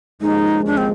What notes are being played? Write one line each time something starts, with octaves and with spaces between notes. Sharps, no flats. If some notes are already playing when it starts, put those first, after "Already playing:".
D#2 C#3 F3 G#3 D#4
D4
C4